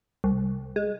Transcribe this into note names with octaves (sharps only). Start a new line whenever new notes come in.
C2
G#3